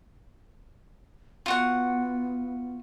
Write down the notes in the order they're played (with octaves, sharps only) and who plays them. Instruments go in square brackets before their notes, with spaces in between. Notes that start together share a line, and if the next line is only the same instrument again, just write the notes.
[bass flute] B3 [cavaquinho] F4 F#4 F#5